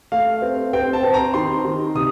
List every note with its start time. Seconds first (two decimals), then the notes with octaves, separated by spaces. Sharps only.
0.12 A3 F5
0.42 C4
0.73 C4 G5
0.93 A5
1.03 C4
1.14 A#5
1.34 D#3 C6
1.65 D#3
1.95 C3 D#6